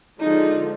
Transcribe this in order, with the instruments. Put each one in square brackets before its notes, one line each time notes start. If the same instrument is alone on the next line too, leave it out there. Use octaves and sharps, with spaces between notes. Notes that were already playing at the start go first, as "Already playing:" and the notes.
[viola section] D3 F3 G#3 [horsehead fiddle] D#4